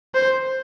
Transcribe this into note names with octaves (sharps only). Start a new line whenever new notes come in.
C5